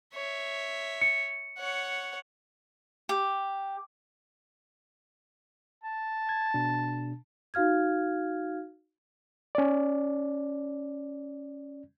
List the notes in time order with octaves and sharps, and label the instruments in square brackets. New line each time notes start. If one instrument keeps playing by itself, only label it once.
[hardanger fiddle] C#5 E5
[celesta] C#7
[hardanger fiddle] C#5 F#5
[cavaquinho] G4
[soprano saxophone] A5
[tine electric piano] G#6
B2 D4
[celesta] D#4 F#4 F5 F6 G#6
[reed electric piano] C#4 D5